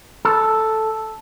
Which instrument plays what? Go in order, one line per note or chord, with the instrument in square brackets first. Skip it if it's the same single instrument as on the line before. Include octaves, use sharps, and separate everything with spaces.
[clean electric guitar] A4